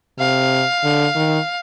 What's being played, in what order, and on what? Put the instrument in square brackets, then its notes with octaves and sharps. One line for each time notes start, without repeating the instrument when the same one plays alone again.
[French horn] C3 [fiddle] F5
[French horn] D3
D#3